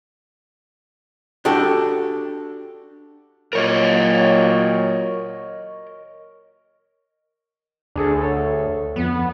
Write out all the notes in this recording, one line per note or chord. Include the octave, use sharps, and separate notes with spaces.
D4 F#4 G4 A4
A#2 F#3 A#4 C#5 D#5
D2 D4 G#4 A4
A4 C#5
F2 B3